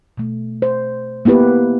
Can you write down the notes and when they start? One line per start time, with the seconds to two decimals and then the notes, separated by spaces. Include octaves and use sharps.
0.18 B2 A3
0.62 C5
1.25 A#3 B3 E4 G4 B4